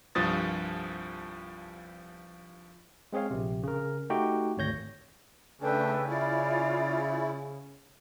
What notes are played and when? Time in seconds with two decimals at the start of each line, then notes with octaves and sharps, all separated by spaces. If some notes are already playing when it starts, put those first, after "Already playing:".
0.15 C2 G2 F3 D#6 A6
3.13 G#3 C4 G#4 C#5 F5
3.31 A#1 C3
3.63 C#3 A#4
4.10 A3 D#4 F#4 G4 G5
4.57 G#1 D2 C#5 G6 A#6
5.61 C#3 A3 D4 A4 B4 G5
6.07 E4 F4 D5